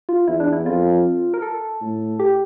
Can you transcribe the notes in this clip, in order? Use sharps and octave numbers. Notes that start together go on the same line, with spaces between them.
F4
E2 E4
D4
E4
F2 F4
A#4
A4
A2
G4